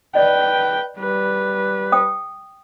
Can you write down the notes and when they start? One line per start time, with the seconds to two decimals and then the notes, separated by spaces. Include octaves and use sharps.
0.15 B4 D5 D#5 G5
0.98 G3 B4
1.92 G5 D#6